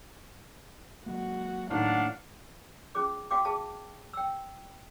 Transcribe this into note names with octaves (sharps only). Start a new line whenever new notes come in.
F#3 G#3 A#3 F#4
A2 D#3 D4 F5 F#5
C#4 F4 G#4 D6
F#4 F5 G5 D6
G#4 F5 A5
G5 E6